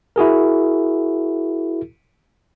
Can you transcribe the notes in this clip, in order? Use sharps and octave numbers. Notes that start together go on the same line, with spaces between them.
E4 F#4 G#4 A#4